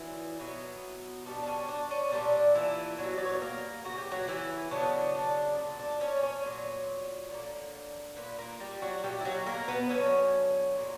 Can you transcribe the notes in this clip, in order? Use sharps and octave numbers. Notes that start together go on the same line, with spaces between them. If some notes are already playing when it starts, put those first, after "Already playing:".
Already playing: A#2 E3 F#3 B3 E4
B2 F#3 B3
B2 G3 B3 D4
D4
C#4
D4
C#4
A#2 G3 A#3 D4
E3 E4
B2 F#3 G3 B3 F#4
D5
C#5
B4
A#3 A#4
C#3 E3 B3 F#4
G4
F#3 F#4
E3 E4
C#3 F#3 B3 D4
D4
A#2 A#3
D4
C#4 C#5
C#4 C#5
A#2 F#3 B3
D3 A#3
A#2 A#3 B4
A#3 A#4
G3 G4
F#3 F#4
B2 G3 A#3 G4
E4
F#3 F#4
A#3 A#4
B3 B4
D3 F#3 B3 C#4 C#5
A#2 F#3 A#3